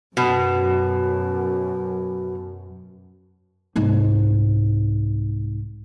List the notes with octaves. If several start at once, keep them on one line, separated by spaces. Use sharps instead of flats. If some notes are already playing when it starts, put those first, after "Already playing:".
F#2 B2
C2 G#2